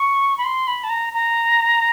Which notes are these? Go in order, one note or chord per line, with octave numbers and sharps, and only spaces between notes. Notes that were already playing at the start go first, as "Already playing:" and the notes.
Already playing: C#6
B5
C6
B5
A5
A#5
A#5